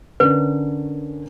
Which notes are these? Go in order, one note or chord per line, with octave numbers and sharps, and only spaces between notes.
D3 C#4 A#4 B4